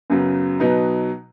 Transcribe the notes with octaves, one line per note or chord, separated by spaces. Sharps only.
F#2 C#3 F#3 B3
B2 F#3 B3 D#4